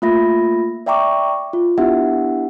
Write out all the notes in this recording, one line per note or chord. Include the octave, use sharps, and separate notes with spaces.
A3 A#3 F4 E5 B5 A#6
D5 E5 G5 A#5 C#6 D6
F4
B3 D4 E4 G4 E5 F#5